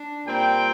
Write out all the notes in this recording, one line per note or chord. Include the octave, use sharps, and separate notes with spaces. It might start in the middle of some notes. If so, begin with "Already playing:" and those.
Already playing: D4
A#2 G3 C4 G5